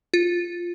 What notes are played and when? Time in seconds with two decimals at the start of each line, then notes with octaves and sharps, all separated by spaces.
0.14 F4